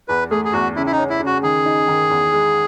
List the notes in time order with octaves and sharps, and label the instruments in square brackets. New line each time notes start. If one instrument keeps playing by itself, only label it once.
[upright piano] E2 [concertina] B4
[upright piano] A3 [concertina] G#4
[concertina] G#4
[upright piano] E2 [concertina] F#4
[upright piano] C#3 [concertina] E4
[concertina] E4
D#4
[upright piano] C#4
[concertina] E4
[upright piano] C#3
[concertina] F#4
[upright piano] D#3 [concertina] G#4
[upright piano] D#4
D#3
E2
G#3